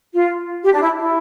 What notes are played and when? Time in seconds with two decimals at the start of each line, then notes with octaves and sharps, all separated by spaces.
0.13 F4
0.63 G4
0.72 D4
0.80 E4
0.97 E4